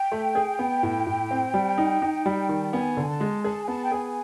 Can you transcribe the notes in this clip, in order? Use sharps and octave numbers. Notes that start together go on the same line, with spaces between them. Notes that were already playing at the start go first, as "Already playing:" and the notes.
Already playing: G5
A3
G#4
B3
A2
A2
C4
G3
D#4
D#4
G3
D#3
A5
B3 G#5
D3
A5
G#3
G#4 A5
G#5
B3 A5
G5
G#4 G#5